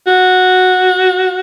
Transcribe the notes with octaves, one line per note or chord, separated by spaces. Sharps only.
F#4